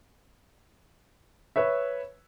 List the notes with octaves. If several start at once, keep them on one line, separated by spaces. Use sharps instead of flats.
B4 C#5 E5